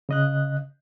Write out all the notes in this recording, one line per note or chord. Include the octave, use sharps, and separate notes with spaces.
C#3 D#5 F#6